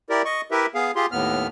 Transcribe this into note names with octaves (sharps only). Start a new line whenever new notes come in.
E4 G4 A#4 D5
D#5 C#6
E4 G4 A#4 B4 E5
B3 G#4 F5
F4 G4 G#4 C6
D#2 A2 B3 F6